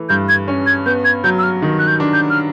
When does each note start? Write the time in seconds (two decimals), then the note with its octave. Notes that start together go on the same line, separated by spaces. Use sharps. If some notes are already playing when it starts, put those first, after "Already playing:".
Already playing: E3 A3
0.09 G2 G6
0.29 G#6
0.48 C#4
0.66 G#6
0.86 B3 G6
1.05 G#6
1.24 F#3 G6
1.38 E6
1.43 F6
1.62 D#3
1.79 F#6
1.87 G6
2.00 D4
2.13 G6
2.30 F6